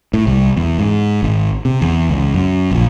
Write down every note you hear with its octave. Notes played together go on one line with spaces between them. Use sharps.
A2
C2
E2
G#2
G#1
C3
E2
C#2
F#2
A#1